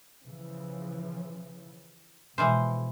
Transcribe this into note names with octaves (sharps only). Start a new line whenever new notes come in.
C#3 E3 F3
B2 E3 F3 G#3 C5